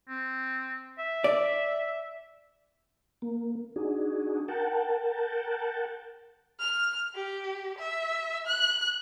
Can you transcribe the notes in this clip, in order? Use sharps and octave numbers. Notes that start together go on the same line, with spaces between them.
C4
E5
D5
A#3
D4 D#4 F#4 G#4
A#4 F#5 G5 A5
F6
G4
E5
F#6